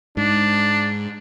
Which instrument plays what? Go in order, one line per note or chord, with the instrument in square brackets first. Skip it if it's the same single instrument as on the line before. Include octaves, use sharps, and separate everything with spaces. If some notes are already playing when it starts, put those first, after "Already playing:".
[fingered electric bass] G#2 [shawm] D4